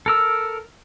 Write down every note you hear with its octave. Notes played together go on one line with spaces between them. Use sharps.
A4 A#4 E6